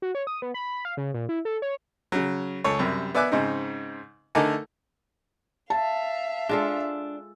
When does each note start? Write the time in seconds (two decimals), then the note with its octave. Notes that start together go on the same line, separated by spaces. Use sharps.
0.02 F#4
0.15 C#5
0.27 D#6
0.42 B3
0.54 B5
0.73 B5
0.85 F5
0.97 C#3
1.14 A#2
1.29 E4
1.45 A4
1.62 C#5
2.12 C#3 F#3
2.64 C#2 A4 C#5
2.79 F#2 C3 G3
3.14 B3 D5 E5 G#5 D6 F#6
3.32 G#2 C#3 C4 D#4
4.35 D3 A3 D#4 A4 A#4 G#5
5.70 E5 F5 A5
6.49 G#3 D4 F4 A4